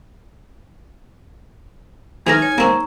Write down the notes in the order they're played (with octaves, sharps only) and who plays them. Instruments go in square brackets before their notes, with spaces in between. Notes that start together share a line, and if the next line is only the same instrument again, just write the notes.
[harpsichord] E3 A3 A#5 [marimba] D#4 F6 [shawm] G#5
[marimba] C#5
[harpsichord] A#3 C4 [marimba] A#5 C#6